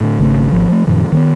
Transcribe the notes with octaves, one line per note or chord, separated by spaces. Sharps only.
A2 D3
G#1 C#3 A3
G#1 F3
F3 G3 A3
F#2 A#2 D#3 F3
D#3 A#3 B3